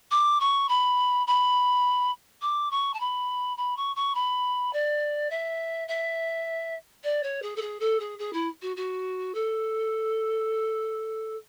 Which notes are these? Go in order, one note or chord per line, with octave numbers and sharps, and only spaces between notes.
D6
C#6
B5
B5
D6
C#6
A5
B5
B5
C#6
C#6
B5
D5
E5
E5
D5
C#5
G#4
A4
G#4
A4
G#4
G#4
E4
F#4
F#4
A4